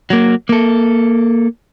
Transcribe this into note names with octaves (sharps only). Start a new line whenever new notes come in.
F#3 A#3
A#3 A4